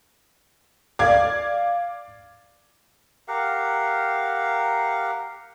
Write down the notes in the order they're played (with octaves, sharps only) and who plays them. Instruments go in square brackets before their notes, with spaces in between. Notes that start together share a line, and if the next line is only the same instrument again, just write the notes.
[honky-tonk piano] D5 F5 G#6
[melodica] G4 A#4 F5 F#5